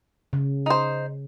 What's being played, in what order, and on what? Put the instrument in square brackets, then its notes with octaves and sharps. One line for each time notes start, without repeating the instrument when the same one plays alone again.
[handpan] C#3
[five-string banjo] D#4 C5